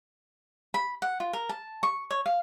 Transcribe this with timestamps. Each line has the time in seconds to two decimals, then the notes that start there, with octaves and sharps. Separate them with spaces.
0.74 B5
1.02 F#5
1.20 F4
1.33 A#4
1.49 A5
1.83 C#6
2.11 C#5
2.26 F5